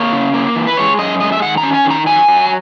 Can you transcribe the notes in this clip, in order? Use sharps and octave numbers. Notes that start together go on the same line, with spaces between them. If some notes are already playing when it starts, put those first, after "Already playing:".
Already playing: A#3 C#5
C#3
A#3
E3
B4
G#3 C#5
F#2 D#5
G#3 D#5
E5
D#3 F#5
A#5
C#4
G#5
D#3
A#5
F#3 G#5
F#3